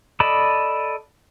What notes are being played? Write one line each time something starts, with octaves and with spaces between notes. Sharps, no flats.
A4 D5 D#5 A5 B5